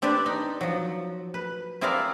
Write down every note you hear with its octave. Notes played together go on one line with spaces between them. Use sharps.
C4 D4 G4 B4 D5
D#4
F3 F#3
B4
C4 E4 G#4 A#4 D5 F5